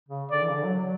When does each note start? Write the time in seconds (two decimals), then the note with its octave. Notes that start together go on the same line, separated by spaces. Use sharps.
0.09 C#3
0.31 D3 D5
0.42 E3
0.49 C#3
0.53 D3
0.64 F#3
0.75 F#3